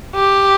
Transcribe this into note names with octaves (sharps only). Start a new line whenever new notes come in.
G4